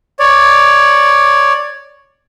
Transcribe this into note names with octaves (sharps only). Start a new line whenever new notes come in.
C#5 D5